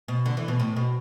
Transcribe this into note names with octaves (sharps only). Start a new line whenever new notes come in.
B2
D3
E3
B2
A2
B2